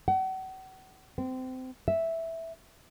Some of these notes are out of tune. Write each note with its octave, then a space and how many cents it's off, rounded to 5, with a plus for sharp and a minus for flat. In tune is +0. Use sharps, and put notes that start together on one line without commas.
F#5 +35
C4 -25
E5 -5